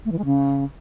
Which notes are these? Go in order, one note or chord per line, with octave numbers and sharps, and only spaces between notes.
A3
E3
G#3
C#3